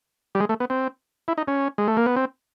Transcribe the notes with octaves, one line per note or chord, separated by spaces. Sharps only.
G3
G#3
A3
B3
C4
E4
D#4
C#4
G#3
A3
A#3
B3
C4